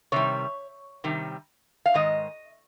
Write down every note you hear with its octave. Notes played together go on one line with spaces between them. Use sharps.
C3 D#3 G3 C#5
C3 D#3 G3
F5
G#2 D#3 G#3 D#5